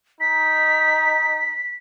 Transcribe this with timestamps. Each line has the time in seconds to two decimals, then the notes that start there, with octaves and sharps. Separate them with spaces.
0.21 D#4 B6